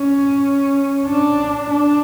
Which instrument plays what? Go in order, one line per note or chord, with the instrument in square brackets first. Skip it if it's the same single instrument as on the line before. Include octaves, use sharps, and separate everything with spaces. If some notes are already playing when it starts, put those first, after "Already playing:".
Already playing: [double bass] C#4
D4
D4